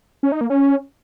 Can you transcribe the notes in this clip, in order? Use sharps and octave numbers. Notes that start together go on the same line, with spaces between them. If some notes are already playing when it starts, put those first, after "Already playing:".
C#4
D#4
A#3
C#4